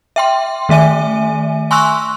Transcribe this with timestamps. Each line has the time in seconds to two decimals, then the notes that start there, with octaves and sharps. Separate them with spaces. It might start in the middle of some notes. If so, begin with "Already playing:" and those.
0.16 E5 G5 C6
0.69 D#3 A3 E5 G#5 D#7
1.71 G#5 C6 C#6 E6 F#6